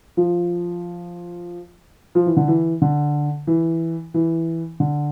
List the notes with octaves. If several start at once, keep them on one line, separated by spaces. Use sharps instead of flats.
F3
F3
E3
D3
E3
D3
E3
E3
D3